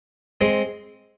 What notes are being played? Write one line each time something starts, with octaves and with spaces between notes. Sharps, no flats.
G#3 C4